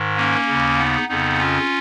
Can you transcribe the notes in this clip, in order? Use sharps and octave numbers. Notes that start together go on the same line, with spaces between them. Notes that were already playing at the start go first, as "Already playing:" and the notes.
Already playing: G#2 D#3
A#3 C#4
D#2 C#3
B3 D#4
F2 C#3 B3 D#4
C#4 F4